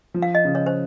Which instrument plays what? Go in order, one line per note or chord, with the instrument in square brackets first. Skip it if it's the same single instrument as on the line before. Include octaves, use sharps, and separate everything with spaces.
[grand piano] F3
[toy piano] F5
D#5
[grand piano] C#3
[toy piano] C#5
C5